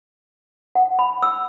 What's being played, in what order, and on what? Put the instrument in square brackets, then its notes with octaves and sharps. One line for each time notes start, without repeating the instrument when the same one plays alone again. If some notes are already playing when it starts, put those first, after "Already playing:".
[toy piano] F#5
B5
E6